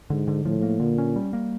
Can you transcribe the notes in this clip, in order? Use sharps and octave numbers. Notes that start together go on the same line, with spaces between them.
G#2 D3
D3
A2 F3
A#3
A#2 D3
C#4
G3
A#3